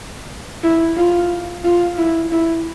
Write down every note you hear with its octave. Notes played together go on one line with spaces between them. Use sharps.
E4
F4
F4
E4
E4